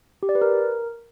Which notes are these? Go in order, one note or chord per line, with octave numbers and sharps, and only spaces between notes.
G4
D5
B4
A#4